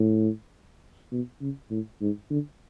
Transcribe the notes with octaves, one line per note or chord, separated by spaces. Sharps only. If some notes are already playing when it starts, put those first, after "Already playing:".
Already playing: A2
B2
C#3
A2
G#2
D3